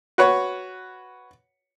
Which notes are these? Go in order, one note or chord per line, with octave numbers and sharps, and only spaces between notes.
F#4 B4 C#5